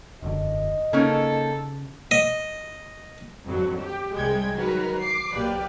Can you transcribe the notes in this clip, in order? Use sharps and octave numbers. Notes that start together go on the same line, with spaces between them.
E1 F#2 D3 D#5
C#3 A#3 C#4 D#4 A4
D#5
G#1 F2 D3 F#3
G4
C2 C3 G3 G#3 G5 G#6
D#3 F#3 F#4 A#4 B4
D6 C7
B1 F#3 A#3 G4 B4 D5